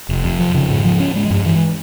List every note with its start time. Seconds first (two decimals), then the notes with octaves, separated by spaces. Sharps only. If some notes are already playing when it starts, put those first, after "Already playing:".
0.09 F1
0.24 F2
0.39 F3
0.54 C#3
0.70 G#2
0.85 F3
1.00 C#4
1.15 G#3
1.30 G2
1.45 E3